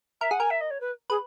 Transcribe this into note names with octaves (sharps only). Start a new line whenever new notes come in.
A#4 E5
G#4 F#5
A#4 G#5
E5
D#5
C#5
B4
G#4 B4